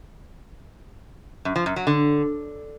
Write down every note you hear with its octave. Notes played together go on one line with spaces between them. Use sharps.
F#2
F3
F#2
F#3
D3